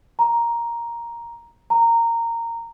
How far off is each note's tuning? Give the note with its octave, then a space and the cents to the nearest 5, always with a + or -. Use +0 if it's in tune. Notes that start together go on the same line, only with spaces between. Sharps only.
A#5 +5
A#5 -15